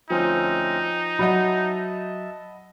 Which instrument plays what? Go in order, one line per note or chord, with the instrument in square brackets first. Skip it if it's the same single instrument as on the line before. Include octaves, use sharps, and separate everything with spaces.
[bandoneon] D2 C4 C#4 [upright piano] F3 [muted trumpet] D#4
[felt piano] F#3 [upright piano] D#5 F#5 B5 [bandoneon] E5 A5